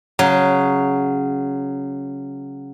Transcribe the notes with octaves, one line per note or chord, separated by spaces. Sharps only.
C#3 F#3